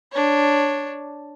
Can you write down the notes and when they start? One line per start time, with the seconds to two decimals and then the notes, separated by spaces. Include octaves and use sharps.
0.12 D4 C#5